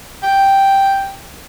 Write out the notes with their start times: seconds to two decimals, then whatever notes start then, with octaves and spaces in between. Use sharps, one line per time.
0.23 G5